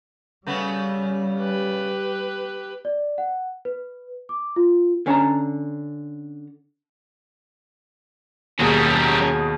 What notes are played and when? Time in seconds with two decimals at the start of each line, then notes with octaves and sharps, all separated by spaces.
0.47 C#3 G3 A3 B3
1.36 G4 B4
2.85 D5
3.18 F#5
3.65 B4
4.29 D6
4.56 F4
5.06 D3 C#4 C#5 F5 A5 A#5
8.60 D#2 B2 F#3 G3 C#4 G#4 A#4